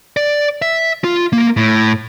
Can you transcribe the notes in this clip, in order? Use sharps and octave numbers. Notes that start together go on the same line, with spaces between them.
D5
E5
F4
A#3
A2